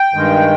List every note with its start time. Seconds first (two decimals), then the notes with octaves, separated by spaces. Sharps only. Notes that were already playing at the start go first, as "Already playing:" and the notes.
Already playing: G5
0.14 G2 D#3 G#3